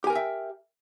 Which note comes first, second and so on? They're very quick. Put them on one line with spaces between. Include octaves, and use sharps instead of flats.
G4 G#5 A#4 G5 E5